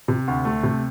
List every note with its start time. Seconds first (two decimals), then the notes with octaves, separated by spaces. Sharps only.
0.08 C3
0.28 D2
0.45 A3
0.63 C3